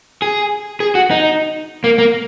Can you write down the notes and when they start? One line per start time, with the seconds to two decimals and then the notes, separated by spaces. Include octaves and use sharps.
0.22 G#4
0.80 G#4
0.95 F#4
1.11 D#4
1.84 A#3
1.98 A#3